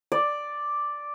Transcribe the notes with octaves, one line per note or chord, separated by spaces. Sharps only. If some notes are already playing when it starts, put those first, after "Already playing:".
D5